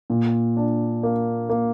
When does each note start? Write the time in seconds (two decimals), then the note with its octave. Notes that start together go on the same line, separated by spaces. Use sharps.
0.10 A#2
0.57 D4
1.03 A#3
1.50 A#3